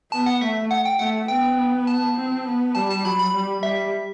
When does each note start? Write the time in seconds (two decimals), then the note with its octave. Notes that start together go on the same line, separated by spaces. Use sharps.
0.11 B3 A5
0.26 F#5
0.41 A3 E5
0.71 F#5
0.85 G5
0.99 A3 F#5
1.28 B3 G5
1.87 A5
2.17 C4
2.46 B3
2.75 G3 A5
2.90 A5
3.05 F#3 B5
3.19 B5
3.34 G3
3.63 G3 E5